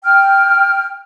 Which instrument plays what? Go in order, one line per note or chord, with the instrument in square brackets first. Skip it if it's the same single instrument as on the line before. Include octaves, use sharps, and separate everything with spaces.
[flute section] G5 F6